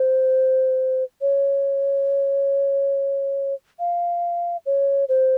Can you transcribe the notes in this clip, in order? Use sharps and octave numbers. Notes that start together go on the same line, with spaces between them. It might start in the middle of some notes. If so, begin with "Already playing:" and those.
Already playing: C5
C#5
F5
C#5
C5